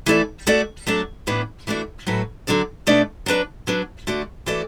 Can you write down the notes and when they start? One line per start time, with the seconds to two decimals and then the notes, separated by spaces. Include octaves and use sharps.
0.06 E3 A3 E4 A4 D5
0.47 A3 F#4 A4 D5
0.87 F#3 A3 D4 A4 D5
1.27 A2 E3 B3 D4 B4
1.67 E3 A3 D4 F#4 D5
2.07 A2 F#3 A3 F#4 B4
2.47 D3 F#3 D4 A4 D5
2.87 B2 A3 D4 B4 D5
3.26 F#3 D4 B4 D5
3.67 F#3 D4 B4
4.07 D3 A3 F#4 D5
4.46 E3 A3 F#4 A4 D5